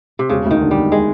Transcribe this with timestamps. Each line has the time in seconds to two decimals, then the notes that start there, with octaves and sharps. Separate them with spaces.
0.19 C3
0.30 E1 C#3
0.45 D2
0.51 D#3
0.61 D3
0.71 E1 G3
0.92 G#3